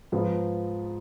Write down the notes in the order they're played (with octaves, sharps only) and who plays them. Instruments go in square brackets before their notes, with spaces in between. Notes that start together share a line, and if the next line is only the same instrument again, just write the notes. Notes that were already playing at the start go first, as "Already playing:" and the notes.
[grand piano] G#2 F3 B3